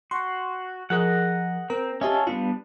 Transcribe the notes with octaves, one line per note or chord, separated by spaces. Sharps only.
F#4 C6 C#6
F3 G#4 A#4 D#5 F#5
C4 A#4 A#5
C#4 F4 G4 A4 D#5 E5
G3 B3 D4 F4